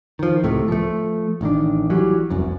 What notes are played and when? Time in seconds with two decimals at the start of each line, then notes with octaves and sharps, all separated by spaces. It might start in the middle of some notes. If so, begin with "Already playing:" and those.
0.19 D#3 F3
0.43 C#2 A2 C3 A3
0.68 F3 A3
1.41 A1 D#3 D4
1.90 E3 F#3 G3
2.30 F1 C2 F#2